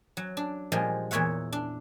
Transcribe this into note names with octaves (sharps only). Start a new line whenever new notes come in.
F#3
D4
A#2 F3 G3 G#3 D#5
E2 A#2 C#5 E5 F#5
D4